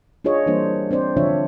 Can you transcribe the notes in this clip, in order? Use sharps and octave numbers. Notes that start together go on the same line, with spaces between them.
D4 F4 G#4 C#5 D#5
E3 G3 A#3 D4 C5
C4 D4 C5 D5
D3 F3 D4 F4 C#5 E5